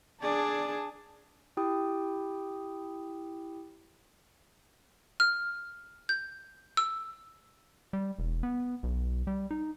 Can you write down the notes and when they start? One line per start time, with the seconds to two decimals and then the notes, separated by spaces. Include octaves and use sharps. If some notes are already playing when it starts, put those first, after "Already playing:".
0.22 D4 G#4 D5 A5
1.57 E4 G4 G5 D#6
5.20 F6
6.09 G6
6.77 E6
7.93 G3
8.19 E1
8.43 B3
8.83 B1
9.27 G3
9.51 D#4